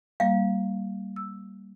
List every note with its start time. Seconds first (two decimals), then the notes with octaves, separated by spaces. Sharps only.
0.20 G3 A#3 F5
1.16 E6